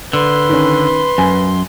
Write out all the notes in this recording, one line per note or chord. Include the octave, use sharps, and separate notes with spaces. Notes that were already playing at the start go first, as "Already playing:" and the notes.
D3 B4 C6
D#3 C#4
F#2 G#5